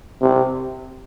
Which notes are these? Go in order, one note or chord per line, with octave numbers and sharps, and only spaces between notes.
C3